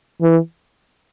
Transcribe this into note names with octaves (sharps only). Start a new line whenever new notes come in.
E3